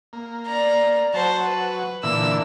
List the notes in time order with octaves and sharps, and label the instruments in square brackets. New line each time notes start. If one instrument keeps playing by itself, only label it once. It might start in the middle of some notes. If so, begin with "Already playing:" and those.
[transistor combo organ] A#3
[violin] D5 A#5
[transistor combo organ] F#3 [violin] C5 A5
[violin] B4
[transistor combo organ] A#2 D3 E3 [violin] E6